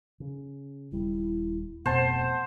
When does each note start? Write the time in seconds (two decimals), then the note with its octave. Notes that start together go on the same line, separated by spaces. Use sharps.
0.20 C#3
0.92 D#1 G3 E4
1.86 D1 F2 B2 A3 C5 F#5 A5